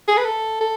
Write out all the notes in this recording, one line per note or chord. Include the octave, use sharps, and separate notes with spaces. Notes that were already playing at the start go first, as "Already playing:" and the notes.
G#4
B4
A4
A4